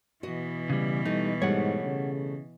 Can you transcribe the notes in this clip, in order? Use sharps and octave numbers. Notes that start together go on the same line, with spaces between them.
B2 E3 F#4 D#5
C#3 G3
G3 A3 D#4
G#2 G3 A3 C#5 F#5
C#3